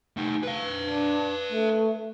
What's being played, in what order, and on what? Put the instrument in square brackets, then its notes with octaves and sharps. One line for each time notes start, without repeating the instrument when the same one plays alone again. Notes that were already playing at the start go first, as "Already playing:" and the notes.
[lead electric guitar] A3 D#4
B4 F5
[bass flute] D4
A3